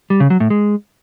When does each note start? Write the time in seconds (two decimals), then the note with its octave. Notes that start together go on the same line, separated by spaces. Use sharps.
0.10 G3
0.20 C#3
0.30 F#3
0.40 A2
0.50 G#3